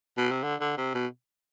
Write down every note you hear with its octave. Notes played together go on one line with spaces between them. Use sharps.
B2
C3
D3
D3
C3
B2